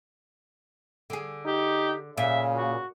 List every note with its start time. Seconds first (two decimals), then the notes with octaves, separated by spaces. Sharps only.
1.10 D3 G#4
1.45 D#4 G4
2.17 A#2 C#3 E5
2.56 F#4